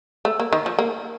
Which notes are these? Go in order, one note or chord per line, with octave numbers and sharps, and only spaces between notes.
A3
A#3
D#3
F3
A#3